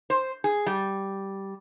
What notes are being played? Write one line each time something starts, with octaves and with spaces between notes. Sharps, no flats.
C5
G#4
G3